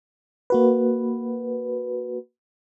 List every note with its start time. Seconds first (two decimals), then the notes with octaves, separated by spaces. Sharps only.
0.50 A#3 F#4 B4